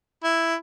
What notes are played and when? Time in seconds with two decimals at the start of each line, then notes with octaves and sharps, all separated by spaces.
0.24 E4